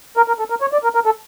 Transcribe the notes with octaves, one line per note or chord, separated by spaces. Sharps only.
A#4
A#4
A4
A#4
C#5
D5
A#4
A#4
A4